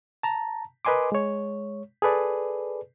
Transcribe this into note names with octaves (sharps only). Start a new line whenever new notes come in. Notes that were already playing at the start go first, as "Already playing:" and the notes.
A5 A#5
A#4 B4 D#5 G#5 C6 D6
G#3 C#5
G#4 A4 B4 D5